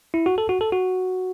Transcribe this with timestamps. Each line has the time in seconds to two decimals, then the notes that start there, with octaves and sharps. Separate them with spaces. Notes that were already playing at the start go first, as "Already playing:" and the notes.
0.14 E4
0.26 F#4
0.38 A4
0.49 F#4
0.61 A4
0.72 F#4